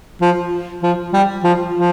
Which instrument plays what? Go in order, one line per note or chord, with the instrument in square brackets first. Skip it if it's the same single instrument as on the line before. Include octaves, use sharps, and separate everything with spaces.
[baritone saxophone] F3
F3
G3
F3
F3